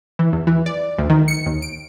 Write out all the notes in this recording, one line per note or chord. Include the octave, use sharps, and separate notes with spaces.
E3
E2
E3
D5
D2
D#3
C#7
D#2
D7